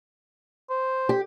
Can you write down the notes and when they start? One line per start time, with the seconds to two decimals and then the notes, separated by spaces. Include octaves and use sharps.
0.70 C5
1.09 G4